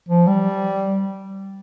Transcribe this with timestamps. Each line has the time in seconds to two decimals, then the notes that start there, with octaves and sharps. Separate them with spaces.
0.09 F3
0.27 G3